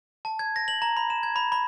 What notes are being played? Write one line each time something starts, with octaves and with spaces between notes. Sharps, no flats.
A5
G#6
A#6
F#7
A#5
B5
E7
G#6
B5
B5